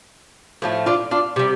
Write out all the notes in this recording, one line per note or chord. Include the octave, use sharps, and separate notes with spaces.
A2 F3 A3
D4 F4
D4 F4
C3 G3